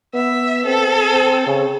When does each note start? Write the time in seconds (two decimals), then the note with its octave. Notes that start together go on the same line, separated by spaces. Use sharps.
0.14 B3 E5
0.66 C4 A4
1.11 C4
1.46 C#3